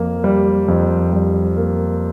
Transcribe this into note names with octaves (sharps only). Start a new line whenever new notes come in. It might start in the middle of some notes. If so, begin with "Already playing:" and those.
Already playing: F2 A#3
G3
F2
G3
A#3